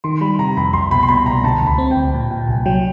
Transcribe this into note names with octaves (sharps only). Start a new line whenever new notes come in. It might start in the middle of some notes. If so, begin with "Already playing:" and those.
D#3 C6
G3 B5
C3 A#5
F2 B5
C2 C6
B2 B5
C6
B2 B5
C2 A#5
D3 A5
D2
B5
C4
G5
D2
A#2
A#2 G5
C2 G#5
F#3 G5